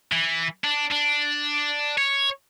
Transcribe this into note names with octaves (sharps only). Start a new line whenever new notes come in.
E3
D4
D4
C#5